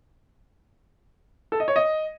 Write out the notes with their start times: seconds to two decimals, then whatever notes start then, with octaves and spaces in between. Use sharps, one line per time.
1.52 A4
1.60 D#5
1.68 C#5
1.76 D#5